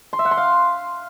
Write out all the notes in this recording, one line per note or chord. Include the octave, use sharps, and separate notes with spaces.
C6
E5
F#5
C6
F5